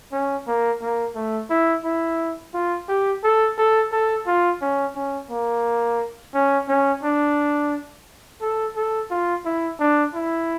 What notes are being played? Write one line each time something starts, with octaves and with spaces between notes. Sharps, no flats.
C#4
A#3
A#3
A3
E4
E4
F4
G4
A4
A4
A4
F4
C#4
C#4
A#3
C#4
C#4
D4
A4
A4
F4
E4
D4
E4